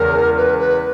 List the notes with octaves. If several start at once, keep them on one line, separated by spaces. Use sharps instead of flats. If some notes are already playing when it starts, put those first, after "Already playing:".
Already playing: E2 C#3 G#3 C#4 A#4
B4
B4